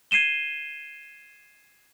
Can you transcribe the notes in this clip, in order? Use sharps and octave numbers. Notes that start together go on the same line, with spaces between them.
G#6 C7 D#7 E7 G7